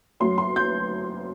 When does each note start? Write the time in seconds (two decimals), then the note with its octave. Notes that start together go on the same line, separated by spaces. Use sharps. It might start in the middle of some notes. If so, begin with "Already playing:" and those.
0.20 F#2 F#3 A3 C6
0.38 C6
0.56 G6